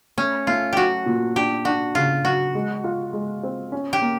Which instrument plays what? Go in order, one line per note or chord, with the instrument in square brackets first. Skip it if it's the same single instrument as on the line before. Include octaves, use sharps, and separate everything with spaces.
[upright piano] A3 [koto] C#4
[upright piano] A3 [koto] F4
[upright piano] F#3 [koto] F#4 G4
[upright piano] A#2
[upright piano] D4 [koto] G4
[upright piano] D4 [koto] F#4
[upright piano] C#3 [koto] F4
[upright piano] F#3 [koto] F#4
[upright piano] G#3
F4
G#3
C4
C#4
[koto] G4
[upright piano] A#3